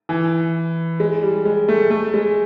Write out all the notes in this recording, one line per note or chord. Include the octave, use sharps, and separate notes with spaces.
E3
G#3
G3
G#3
A3
A3
G#3